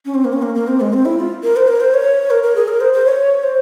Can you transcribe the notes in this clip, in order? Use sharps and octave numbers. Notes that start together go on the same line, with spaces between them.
C#4
C4
A#3
C#4
A#3
A#3
C4
G#3
C4
E4
F4
A#4
C5
A#4
C5
C#5
A#4
A#4
G#4
A#4
C5
C5
C#5
C5